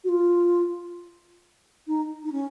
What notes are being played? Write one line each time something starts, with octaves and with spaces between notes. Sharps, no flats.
F#4
F4
D#4
D#4
C#4